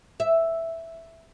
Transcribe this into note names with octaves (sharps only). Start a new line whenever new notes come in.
E5